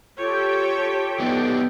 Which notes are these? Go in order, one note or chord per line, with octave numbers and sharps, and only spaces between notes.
F4 G4 A4 C#5 G5
B3 D4 D#4